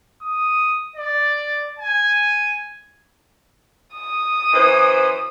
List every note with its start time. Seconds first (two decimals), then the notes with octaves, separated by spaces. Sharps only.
0.22 D#6
0.96 D5
1.79 G#5
3.94 D#6
4.53 F#2 E3 C5